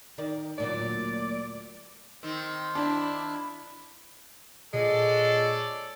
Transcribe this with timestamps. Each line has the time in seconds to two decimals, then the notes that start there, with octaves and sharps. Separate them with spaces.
0.18 D#3 A#4 D5
0.58 D2 A#2 F#3 D5
2.23 D#3 C4
2.75 D4 E4
4.73 A#2 G#3 A4 C#5 D5